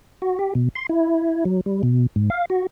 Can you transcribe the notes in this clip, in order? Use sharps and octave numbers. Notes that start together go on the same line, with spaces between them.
F#4
G4
B2
C6
E4
F#3
G3
B2
G#2
F5
F#4